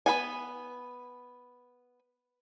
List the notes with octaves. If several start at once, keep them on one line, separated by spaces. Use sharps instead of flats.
B3 B4 F#5 G#5